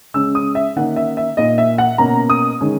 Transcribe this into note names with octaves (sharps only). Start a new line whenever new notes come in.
C#3 G#3 C#4 E6
D#6
E5
D#3 A#3 C#4 F#5
E5
E5
A#2 A#3 D#4 D#5
E5
F#5
B2 A#3 C#4 A#5
D#6
D#3 G#3 C#4